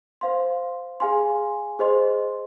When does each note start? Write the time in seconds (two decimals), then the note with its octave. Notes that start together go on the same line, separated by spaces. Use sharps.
0.21 C5 F5 C6
1.00 G#4 F5 G#5 C6
1.79 G#4 C5 D#5 C6